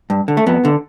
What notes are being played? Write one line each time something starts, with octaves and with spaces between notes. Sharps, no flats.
G2
D3
A3
F2 B3
D3